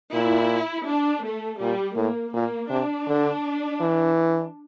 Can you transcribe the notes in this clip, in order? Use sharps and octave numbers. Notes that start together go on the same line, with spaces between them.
A#2 E4
D4
A3
A#2 G3
A2 A#3
A#2 A#3
C3 D4
D3
E3